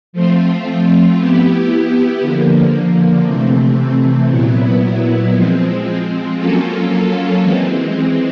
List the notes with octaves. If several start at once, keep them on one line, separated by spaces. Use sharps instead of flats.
F3 A3 C4 F4
B3 E4 G4
D3 F3 A#3
C3 E3 A3 C4
A#2 F#3 B3 E4
F3 G#3 C4
F#3 A#3 C#4 F4 A4
E3 G#3 C4